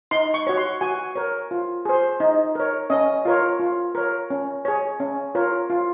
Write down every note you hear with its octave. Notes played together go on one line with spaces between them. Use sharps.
D#4 C6
C#6
F#4 C#5
C6
F#4 G#5
A#4 C#5
F4
G#4 C5
D#4
A#4 C#5
C#4 D#5
F4 A#4 C#5
F4
A#4 C#5
C#4
G#4 C#5
C#4
F4 A#4 C#5
F4